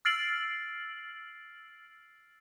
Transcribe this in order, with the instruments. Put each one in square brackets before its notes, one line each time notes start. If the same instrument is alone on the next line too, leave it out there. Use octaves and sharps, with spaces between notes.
[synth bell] E6 F6 A6 C7 D7 F#7